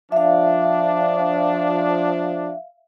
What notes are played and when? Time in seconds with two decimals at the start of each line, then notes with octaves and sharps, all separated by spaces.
0.12 F3 D4 E5 F5